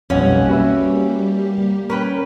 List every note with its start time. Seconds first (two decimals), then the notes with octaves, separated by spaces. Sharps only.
0.10 B1 F2 G3 A#3 C#4 G4 F#5
0.49 F#4 B4 E5
1.90 C#4 A#4 B4 G5